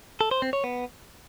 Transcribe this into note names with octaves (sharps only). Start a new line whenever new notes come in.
A4
C5
C4
C#5
B3